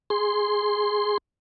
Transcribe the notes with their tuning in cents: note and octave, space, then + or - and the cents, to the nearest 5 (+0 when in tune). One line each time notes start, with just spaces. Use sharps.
G#4 +0 C6 +0